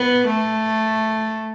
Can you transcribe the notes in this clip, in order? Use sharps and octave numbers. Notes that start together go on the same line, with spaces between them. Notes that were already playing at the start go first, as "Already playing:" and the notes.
Already playing: B3
A3